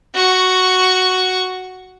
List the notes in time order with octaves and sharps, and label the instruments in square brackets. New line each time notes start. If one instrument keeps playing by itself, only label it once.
[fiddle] F#4 C#6